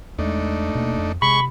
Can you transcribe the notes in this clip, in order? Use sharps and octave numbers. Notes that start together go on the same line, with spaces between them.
E2 G#3 A3 D4 D#4
D#1 B2 A#3
F2
C3 G#3 B5 C#6